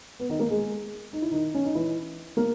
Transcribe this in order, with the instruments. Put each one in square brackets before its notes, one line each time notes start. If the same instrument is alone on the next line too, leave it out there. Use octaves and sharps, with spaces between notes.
[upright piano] B3
D#3 D#4
A#3 A#4
G#3 G#4
D#4
E4
D#3 D#4
C#4
D#4
E3 E4
A#3 A#4